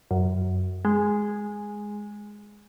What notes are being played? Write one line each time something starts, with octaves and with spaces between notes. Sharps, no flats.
F#2
G#3